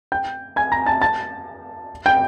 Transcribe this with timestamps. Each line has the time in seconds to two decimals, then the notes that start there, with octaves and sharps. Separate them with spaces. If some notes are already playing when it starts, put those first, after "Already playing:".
0.12 G5 G6
0.56 G#5 G#6
0.72 A#5 A#6
0.86 A5 A6
1.01 A5 A6
2.06 G5 G6